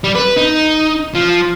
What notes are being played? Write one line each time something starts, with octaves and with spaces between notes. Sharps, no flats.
G3
B4
D#4
F3